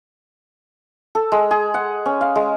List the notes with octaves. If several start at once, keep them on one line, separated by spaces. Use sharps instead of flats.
A4
G#3
G#4
F#5
C#4
F5
G#3